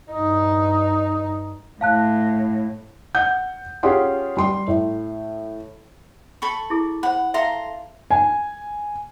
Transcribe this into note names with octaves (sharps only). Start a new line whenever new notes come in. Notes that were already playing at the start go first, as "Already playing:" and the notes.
G2 D#4
A2 F5 A5 F#6
F#5 G6
C#4 F4 G4 G#4 F#5 C6
G3 C6
A2
A4 B5 C#6
E4 G#4
C5 F#5 B5
A4 E5 F5 A#5 C6
G#5